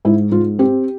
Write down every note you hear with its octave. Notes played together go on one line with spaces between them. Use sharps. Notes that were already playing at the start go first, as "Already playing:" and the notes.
G#2 E4
G#2 F4
C4 G4